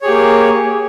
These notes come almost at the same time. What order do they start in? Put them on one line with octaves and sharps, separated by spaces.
C#5 G#4 G4 A#3